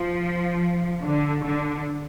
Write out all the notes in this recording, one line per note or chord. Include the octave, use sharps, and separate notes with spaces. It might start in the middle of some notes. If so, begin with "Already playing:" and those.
Already playing: F3
D3
D3